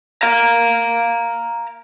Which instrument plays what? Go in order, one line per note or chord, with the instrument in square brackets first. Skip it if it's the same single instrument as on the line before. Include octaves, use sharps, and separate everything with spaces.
[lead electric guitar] F5 A#5